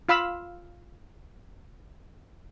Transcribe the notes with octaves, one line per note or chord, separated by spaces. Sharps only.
F4 F5 B5 E6